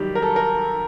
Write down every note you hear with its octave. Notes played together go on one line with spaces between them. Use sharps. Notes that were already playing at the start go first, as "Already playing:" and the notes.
Already playing: F#2 D#3 G3 G4
A#4
A4
A#4